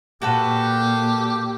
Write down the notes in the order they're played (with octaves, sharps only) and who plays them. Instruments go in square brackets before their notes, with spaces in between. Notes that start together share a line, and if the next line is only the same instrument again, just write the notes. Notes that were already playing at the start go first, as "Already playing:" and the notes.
[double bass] A#2 A#3 [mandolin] F#4 A4 B4 [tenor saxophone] G4